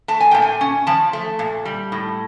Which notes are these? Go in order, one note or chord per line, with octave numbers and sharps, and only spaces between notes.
A3 A5
G#5
A#2 G5
G#5
C#4
F3 A5
A3
A#2
G3
A2